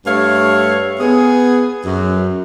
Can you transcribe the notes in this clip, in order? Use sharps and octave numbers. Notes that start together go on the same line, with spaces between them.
G2 A3 C#5 F5
B3 G#4
F#2